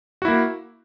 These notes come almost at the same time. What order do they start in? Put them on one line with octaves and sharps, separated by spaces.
F#4 E4 A#3